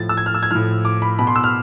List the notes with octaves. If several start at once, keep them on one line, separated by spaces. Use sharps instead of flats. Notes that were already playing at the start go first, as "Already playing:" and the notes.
Already playing: A2 F3 A6
E6
G#6
F6
E6
G#6
A2 F3 F6
D6
B5
B2 B5
C6
E6
F6